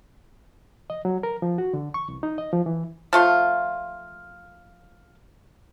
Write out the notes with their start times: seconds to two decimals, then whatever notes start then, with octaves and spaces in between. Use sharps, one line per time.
0.90 D#5
1.05 F#3
1.23 A#4
1.42 F3
1.58 F#4
1.74 D3
1.94 C#6
2.08 C2
2.23 D#4
2.38 D#5
2.53 F3
2.66 E3
3.13 F3 A3 F4